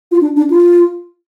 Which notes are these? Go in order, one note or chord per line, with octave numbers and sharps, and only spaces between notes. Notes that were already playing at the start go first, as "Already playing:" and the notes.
F4
D4
D4
F4